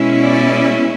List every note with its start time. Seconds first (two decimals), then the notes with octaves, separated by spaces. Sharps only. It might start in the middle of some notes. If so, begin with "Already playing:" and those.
Already playing: B2 G#3 C#4 E4
0.23 D5